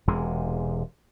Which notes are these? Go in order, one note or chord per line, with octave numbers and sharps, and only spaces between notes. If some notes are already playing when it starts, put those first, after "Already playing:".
E1 E2 C3 G#3